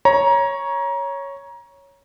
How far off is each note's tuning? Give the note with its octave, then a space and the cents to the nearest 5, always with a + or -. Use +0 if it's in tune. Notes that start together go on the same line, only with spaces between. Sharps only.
C#5 +0 A#5 +25